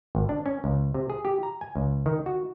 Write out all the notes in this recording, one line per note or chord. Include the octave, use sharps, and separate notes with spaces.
G#1
D4
C#4
C#2
C3
G#4
G4
A#5
G#5
C#2
D#3
F#4